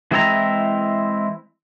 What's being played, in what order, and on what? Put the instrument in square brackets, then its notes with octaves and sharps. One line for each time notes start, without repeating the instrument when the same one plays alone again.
[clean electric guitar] E3 G#3 C4 E4 F#5 A#5